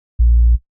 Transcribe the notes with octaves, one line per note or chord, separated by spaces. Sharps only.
A#1